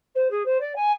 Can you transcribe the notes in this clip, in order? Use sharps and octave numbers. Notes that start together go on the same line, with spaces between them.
C5
G#4
C5
D5
G#5